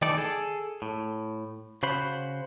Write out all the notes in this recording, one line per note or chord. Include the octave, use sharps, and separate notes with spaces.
D#3 E3 A3 D#4 A4 D5
G#4 A4
A2
C#3 F#4 C5 B5